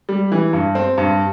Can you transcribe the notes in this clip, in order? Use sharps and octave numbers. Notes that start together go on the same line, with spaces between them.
G3
E3
G2
C4
G2